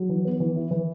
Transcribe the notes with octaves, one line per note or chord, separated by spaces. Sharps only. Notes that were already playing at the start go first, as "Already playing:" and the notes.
Already playing: F#3
E3
B3
E3
E4
E3